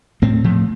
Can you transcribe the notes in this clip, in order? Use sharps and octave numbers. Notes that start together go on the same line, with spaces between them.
A2 A3 C4
A2 F3 A3